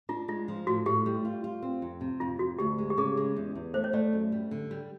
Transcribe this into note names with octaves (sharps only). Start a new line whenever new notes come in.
D4 F4
G#3 F4
F3
A2 F#4
A2 G4
G3
F4
F4
C4
F2
C3
F2 F4
F2 F#4
D2 G4
G#3
G4
C#3 G#4
G#3
E2
E2
A3 C5
C#5
A3 D5
F#2
G3
D3
G3